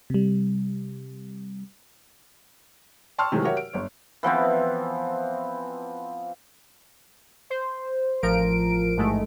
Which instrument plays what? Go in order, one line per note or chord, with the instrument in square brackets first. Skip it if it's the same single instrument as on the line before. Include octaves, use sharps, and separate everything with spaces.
[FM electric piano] C3 G3
[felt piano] G5 A5 C6 C#6 E6 F6
C3 D#3 E3 F#3 G#3 A3
F#4 G4 A#4 C#5 E5 F#5
D7
G1 C#5
[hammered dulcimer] E3 F3 B3 C4
[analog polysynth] C5
A1 F3 A#4 D7
A1 G#2 G#3 A3